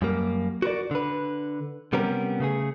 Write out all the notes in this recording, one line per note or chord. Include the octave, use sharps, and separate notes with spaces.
F#2 G3 A#3
F#4 A#4 B4 D5
D3 B4
C3 G3 B3 C#4 A#4
C#3 A3 G#4